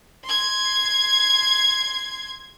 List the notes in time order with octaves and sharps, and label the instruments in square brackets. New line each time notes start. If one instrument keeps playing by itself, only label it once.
[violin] C6 G#6